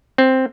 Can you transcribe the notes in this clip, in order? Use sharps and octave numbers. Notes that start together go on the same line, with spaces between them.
C4